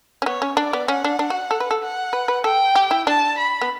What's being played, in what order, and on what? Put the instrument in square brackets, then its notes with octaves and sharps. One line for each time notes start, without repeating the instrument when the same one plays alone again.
[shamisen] C#4
[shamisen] B3 [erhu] C#5
[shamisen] C#4
[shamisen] D4 [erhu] D5
[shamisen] B3
[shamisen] C#4 [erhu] F#5
[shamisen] D4
D4
F#4
A4
B4
A4
[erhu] F#5
[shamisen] B4
B4
[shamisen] A4 [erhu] G5
[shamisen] G4
E4
[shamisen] D4 [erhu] A5
[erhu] B5
[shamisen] B3